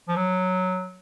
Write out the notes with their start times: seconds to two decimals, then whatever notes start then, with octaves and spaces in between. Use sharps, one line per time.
0.08 F3
0.16 F#3